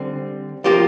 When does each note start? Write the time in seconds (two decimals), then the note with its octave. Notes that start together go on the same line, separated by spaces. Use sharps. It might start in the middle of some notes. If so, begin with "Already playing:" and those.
Already playing: D3 G3 C4
0.64 F3 A#3 F4 G4